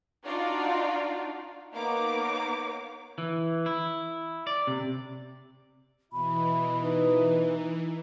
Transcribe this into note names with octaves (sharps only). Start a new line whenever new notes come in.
D4 D#4 F4 F#4 D5
A#3 B3 D#4 C#5 D6
E3
E4
D5
C3
B2 E3 E4 D#5 B5
D#4 B4